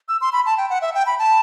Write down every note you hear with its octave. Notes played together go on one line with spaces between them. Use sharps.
E6
C6
B5
A5
G5
F#5
E5
G5
B5
A5